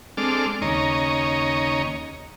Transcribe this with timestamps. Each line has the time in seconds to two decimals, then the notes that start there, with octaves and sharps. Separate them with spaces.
0.17 G#3 C4 D4 A4 D6 F6
0.62 D#2 C#3 C#5 D#5 A#5